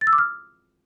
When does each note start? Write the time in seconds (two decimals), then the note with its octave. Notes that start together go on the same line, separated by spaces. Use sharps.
0.01 A6
0.07 E6
0.13 D6
0.18 F6